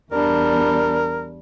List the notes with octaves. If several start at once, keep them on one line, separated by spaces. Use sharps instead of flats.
E2 G3 D4 A#4